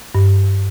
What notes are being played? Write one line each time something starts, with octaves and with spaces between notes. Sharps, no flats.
G2